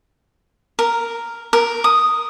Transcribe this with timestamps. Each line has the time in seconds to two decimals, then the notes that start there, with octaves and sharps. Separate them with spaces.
0.79 A#4
1.53 A#4
1.84 D#6